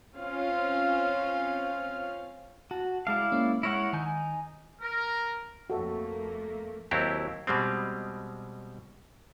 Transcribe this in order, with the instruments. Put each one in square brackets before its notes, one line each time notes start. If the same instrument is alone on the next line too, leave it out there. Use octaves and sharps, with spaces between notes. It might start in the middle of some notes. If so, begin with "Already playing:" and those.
[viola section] C4 C#4 F4 F5
[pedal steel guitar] F#4 [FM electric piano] A5
[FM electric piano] G#3 A5 [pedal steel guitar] E4 D5 F5
[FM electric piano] G#3 A#3 C#4
[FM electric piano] G#3 F6 A#6 [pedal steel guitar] E4 C#5 F#5
[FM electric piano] D#3 [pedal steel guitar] D#4 G#5 G6
[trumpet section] A#4
[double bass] F2 [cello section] A3 A#3 [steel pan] F#4 A4 E5
[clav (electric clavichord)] D#2 F#3 C4 E4 G4
B2 G3 G#3 C4